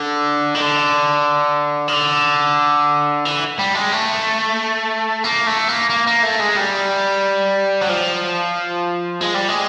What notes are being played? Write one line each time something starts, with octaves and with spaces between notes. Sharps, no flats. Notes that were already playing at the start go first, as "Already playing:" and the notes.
Already playing: D3
D#3
D3
D#3
D3
E3
G3
G#3
A3
A#3
A3
A#3
A#3
A#3
A3
G#3
G3
F#3
F3
G#3
G3
G#3